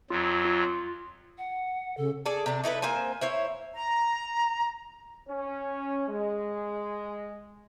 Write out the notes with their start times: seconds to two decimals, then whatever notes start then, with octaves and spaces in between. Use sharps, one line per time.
0.10 F2 F#3 F4
0.45 F4
1.38 F#5
1.97 C#3 A4
2.26 G#4 A4 D5
2.46 C3 D4
2.64 D#4 E4 A4 B4
2.82 A#3 C4 C5 G#5
3.21 E4 C5 C#5
3.73 A#5
5.28 C#4
6.08 G#3